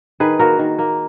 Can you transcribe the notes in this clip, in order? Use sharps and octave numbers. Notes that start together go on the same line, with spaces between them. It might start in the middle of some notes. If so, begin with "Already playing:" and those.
D#3 G#4 B4
A#3 F#4 A#4
D#3
A#3